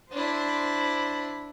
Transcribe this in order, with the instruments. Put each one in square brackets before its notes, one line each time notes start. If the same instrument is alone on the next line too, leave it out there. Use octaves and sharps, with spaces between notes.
[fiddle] D4 E4 [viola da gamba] C5